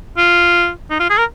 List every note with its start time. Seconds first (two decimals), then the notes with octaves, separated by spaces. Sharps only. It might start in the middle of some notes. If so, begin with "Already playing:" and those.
0.17 F4
0.90 D#4
0.99 F4
1.10 G#4
1.18 A#4